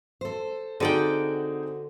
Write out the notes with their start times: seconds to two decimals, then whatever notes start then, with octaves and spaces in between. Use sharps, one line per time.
0.21 A4 C5
0.80 D3 C4 D#4 F#4 G#4 D5 G5